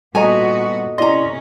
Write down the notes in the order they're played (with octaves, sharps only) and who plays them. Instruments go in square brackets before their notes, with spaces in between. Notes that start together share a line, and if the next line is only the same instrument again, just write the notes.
[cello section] A#2 B3 F#4 [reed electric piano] G3 [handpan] A4 D#5 [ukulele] G#5 A#5
[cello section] C3 C#4 [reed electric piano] E4 D5 C6 [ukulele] D#5 A#5